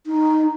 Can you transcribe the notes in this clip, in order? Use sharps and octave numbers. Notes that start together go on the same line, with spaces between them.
D#4